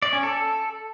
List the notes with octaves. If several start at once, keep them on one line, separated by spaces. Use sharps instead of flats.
D5
C#4
A4